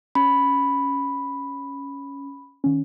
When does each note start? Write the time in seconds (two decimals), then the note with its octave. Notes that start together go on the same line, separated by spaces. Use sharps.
0.15 C#4 B5
2.64 D#3 C#4